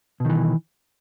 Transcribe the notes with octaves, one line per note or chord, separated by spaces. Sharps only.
B2 D#3 E3